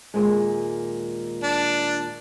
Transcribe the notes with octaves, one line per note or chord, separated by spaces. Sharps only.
D#2 A#2 G#3
D4